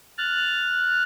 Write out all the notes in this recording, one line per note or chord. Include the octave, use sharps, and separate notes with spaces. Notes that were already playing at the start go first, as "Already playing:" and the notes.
F6 F#6 A6